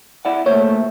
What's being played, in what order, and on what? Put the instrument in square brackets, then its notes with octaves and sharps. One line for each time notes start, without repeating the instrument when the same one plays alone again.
[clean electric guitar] E4 D5 F#5
[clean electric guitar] D2 A#2 C5 [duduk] A3 [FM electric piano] C#5